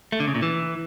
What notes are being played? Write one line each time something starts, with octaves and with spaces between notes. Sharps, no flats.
A3
D3
C#3
A#2
E3